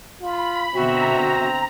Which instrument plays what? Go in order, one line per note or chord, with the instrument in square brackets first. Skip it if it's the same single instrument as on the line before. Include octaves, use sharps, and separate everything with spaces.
[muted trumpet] F4 [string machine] B5
[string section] B2 D3 E5 [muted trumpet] C4 [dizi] F#4 [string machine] A#5